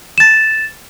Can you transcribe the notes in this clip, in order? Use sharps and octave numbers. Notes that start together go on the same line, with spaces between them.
A6 E7